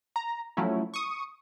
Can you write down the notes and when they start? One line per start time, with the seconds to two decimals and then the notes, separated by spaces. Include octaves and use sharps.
0.16 A#5
0.57 F3 F#3 A3 C#4 E4
0.94 C#6 D#6